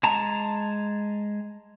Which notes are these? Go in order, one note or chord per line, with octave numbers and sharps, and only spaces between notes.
G#3 A5 A#5